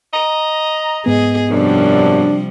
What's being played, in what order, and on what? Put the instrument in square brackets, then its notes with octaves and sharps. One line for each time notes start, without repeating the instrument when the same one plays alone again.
[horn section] D#5 A#5
[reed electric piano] G#2 B3 [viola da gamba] G#4 D#5
[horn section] F#2 [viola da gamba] C3 F3 G3 [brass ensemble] D4